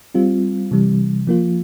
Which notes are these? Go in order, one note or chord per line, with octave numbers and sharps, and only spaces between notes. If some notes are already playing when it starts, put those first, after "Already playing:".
G3 C4 F4
C3 E3 G3
F3 A#3 F4